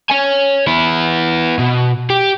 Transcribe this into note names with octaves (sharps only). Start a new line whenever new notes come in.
C#5 G#5
B3 E4
B2
G4